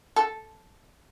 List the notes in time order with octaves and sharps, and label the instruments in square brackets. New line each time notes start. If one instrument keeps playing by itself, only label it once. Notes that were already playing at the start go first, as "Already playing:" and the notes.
[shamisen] A4